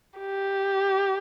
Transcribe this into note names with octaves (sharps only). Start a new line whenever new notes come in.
G4